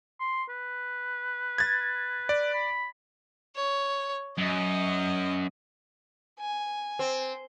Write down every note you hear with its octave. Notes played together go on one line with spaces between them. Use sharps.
C6
B4
G#6 A6
D5
B5
C#5
F#2 D#5
G#5
C4